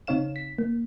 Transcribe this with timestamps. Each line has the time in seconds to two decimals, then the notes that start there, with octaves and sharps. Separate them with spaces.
0.07 C#3 C4 D#4 C#5 F5 E7
0.36 B6
0.58 A#3